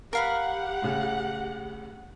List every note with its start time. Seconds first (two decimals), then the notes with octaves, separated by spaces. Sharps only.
0.13 G4 A#4 F5 F#5 B5
0.82 A2 C#3